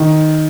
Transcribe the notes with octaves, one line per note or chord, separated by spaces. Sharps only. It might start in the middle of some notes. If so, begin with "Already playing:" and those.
Already playing: D#3